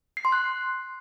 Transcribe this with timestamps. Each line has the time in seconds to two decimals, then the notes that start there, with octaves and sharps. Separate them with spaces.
0.17 C7
0.25 C6
0.32 F#6